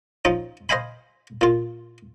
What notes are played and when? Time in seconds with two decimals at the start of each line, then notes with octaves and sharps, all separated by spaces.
0.25 F3 C#4 D#4
0.69 C5 D#5 F5 G#5 B5
1.41 A#2 F4